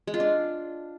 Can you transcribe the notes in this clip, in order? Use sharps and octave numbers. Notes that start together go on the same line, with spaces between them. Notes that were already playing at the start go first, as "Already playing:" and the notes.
G#3
F4
D4